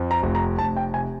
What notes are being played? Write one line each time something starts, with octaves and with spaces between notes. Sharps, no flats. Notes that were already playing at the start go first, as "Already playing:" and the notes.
Already playing: F2
A#5
F1
A#5
F1 A5
G5
C3 G#5